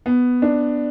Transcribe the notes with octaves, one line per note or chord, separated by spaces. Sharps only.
B3
D4